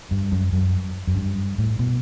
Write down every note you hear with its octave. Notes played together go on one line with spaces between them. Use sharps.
G2
F#2
F#2
F#2
G2
A2
B2